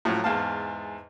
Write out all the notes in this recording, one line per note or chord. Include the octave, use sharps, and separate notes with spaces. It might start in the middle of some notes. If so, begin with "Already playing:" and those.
A2 F3 F#3
E2 G#2 F5 A5